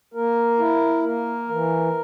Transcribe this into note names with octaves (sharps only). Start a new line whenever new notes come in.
A#3 A#4
E4
A#3 A#4
E3